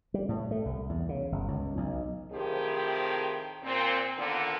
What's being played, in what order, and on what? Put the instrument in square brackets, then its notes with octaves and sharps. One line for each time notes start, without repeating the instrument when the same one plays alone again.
[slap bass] G3
A2
A3
C2
E2
C#3
G1
C#2
B1
[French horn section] A2 C3 D#3 F3 G4 G#4
A#2 C4
A#2 D3 D#3 A#3 B3